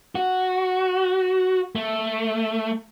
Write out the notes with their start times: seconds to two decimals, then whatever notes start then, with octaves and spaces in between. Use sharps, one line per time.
0.15 F#4
1.75 A3